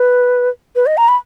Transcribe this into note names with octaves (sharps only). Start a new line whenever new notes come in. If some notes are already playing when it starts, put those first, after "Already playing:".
Already playing: B4
B4
D#5
A#5
B5